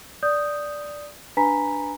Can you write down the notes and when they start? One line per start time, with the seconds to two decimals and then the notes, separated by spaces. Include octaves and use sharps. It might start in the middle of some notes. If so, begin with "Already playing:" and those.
0.23 D5 D#6 G6
1.37 D4 B4 G#5 A#5 B5 B6